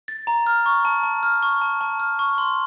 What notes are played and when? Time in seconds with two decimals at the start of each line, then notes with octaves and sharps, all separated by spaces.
0.08 A6
0.27 A#5
0.47 F6
0.66 C#6
0.85 A5
1.03 A5
1.23 F6
1.43 C#6
1.61 A5
1.81 A5
2.00 F6
2.19 C#6
2.38 C6